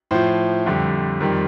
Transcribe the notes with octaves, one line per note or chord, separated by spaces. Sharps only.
A2 F3 C5
F2 D3 G3
F2 D#3 G3